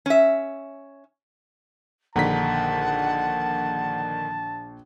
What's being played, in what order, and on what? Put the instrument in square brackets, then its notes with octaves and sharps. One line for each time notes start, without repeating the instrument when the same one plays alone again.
[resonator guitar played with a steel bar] C#4 E5
[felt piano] A#1 A#5 [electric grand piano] D3 D#3 B6 [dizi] F#5 [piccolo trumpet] A5